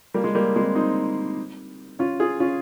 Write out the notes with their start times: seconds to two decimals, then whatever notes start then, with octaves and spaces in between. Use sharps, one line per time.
0.14 G3 A#3
0.24 G#3
0.35 G3 A#3
0.55 G#3 C4
0.75 C4 D#4
1.99 C#4 F4
2.20 F4 G#4
2.40 C#4 F4